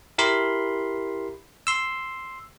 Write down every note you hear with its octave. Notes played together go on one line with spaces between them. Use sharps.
E4 G4 A#4 B5 C6
C6 E6